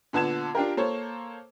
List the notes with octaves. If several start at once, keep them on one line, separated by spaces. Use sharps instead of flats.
A#2 D3 B3 A5 G#6 E7
D4 F4 G4 A#4
A#3 A4 C5 C#5